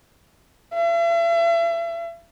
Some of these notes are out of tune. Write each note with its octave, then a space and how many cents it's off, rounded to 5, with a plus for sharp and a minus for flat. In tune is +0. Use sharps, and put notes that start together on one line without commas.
E5 +40